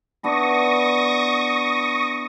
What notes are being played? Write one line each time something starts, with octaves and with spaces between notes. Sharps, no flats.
B3 D4 E4 C#6 D#6 A#6